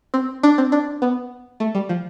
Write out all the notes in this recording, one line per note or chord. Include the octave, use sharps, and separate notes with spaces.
C4
D4
C4
D4
B3
A3
G3
F3